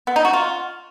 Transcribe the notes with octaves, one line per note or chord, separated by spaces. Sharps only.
B3
D#4
F#4
F4